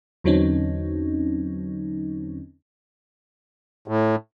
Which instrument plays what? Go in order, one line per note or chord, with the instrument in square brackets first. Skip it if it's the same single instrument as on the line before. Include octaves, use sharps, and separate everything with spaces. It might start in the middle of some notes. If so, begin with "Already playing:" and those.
[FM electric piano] E2 D3 F#3 C4 C#4 D#4
[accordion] A2